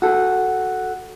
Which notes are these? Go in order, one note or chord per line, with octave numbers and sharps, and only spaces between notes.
F#4 A4